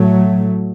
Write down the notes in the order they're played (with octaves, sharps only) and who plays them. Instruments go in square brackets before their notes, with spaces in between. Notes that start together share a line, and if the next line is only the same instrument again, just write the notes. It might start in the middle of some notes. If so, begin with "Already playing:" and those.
Already playing: [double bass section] A2 F#3 A3